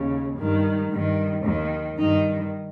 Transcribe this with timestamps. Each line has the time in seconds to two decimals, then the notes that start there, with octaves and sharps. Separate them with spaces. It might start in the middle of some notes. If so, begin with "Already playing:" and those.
Already playing: D#2 C#3
0.37 G2 D#3
0.91 G2 D#3
1.44 D#2 D#3
1.97 G2 D#3 D#4